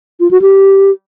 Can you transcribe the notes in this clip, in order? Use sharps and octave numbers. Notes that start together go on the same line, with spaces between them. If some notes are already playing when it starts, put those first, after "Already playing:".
F4
F#4
G4